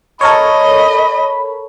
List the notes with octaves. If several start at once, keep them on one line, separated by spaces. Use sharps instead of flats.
A4 A#4 C#5 D#5 B5